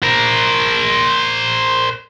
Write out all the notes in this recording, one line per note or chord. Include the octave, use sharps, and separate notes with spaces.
A#4 C5